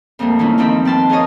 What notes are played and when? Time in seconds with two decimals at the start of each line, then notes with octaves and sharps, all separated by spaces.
0.19 F2 A#2 G3 A3 A#3
0.39 D#3 E3 C#4 E4
0.58 G2 D#3 F3 G3 C4 B5
0.85 C4 B4 A5 C6
1.09 F4 G#4 A#4 C#5 D#5